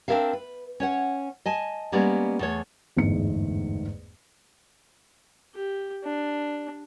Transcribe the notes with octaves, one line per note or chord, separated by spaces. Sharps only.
C4 D4 F4 A#4 E5 F5
B4
C#4 C#5 F#5
D#5 G#5 A5
G3 G#3 A#3 B3 C#4 D5
E2 A3 C#5
G1 E2 G#2 A3 C#7
G4
D4